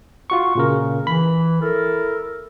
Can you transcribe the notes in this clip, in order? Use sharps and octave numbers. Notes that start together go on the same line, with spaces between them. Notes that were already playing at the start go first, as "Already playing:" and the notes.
F4 F#4 C#6
A#2 C#3 A#4
E3 B5
E4 A4 A#4